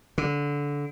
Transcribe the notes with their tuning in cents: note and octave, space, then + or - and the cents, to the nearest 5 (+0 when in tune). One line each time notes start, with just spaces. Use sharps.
D3 -20